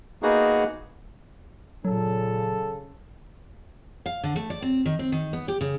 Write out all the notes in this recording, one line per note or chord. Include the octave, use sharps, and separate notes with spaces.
A#3 B3 D#4 F#4 G#4
A#2 C#3 F#3 A4
F5
D3
A3
D5
C4
D#3
C4
D#3
B3
G4
C#3